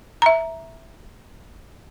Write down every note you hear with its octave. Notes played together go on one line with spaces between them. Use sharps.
E5 A#5